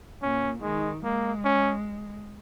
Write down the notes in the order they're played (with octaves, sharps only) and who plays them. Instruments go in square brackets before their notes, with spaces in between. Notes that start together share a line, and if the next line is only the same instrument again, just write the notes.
[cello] A#2 [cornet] C#4
[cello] D#3 [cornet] G#3
[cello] G#3 [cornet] A#3
[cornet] C#4